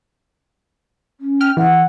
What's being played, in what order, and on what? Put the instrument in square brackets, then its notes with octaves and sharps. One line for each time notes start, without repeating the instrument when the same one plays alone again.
[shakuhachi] C#4
[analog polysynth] G5 F6
[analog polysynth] E3 [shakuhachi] F#5